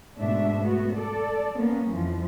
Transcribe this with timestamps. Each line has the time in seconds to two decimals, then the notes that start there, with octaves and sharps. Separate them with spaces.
0.19 G#2 B2 A3 D4 E5
0.62 A3 B3 F#4
0.94 A4 D5
1.58 A#3 B3 C#4
1.90 F2 E3 F3